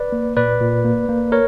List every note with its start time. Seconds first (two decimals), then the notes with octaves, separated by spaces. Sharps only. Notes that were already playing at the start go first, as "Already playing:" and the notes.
Already playing: B4 D5
0.12 A#3
0.37 A#2 B4 D5
0.60 A#2
0.85 A#3
1.08 A#3
1.32 A#4 C#5